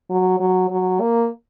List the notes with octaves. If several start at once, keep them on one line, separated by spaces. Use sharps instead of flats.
F#3
F#3
F#3
A#3